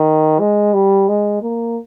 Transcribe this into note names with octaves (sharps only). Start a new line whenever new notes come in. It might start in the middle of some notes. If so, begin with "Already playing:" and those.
Already playing: D#3
G#3
G3
G#3
A#3